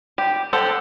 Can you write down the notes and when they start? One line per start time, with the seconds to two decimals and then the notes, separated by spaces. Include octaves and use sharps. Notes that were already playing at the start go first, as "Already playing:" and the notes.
0.18 G4
0.53 G4 A4 C5 F#5